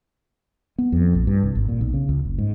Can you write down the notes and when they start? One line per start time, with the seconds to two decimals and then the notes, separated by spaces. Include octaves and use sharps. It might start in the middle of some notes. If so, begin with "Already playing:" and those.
0.78 B3
0.92 F2
1.15 A#1
1.27 G2
1.43 C2
1.55 G#1
1.68 A#2
1.81 B1
1.94 C#3
2.09 C#2
2.25 F#1
2.38 G#2